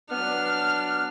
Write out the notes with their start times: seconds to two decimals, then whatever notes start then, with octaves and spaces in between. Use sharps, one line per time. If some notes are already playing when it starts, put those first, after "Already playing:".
0.11 F#3 B3 D4 F6